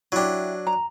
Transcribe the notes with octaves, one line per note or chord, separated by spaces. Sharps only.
F#3 D4 E4 G4
A#5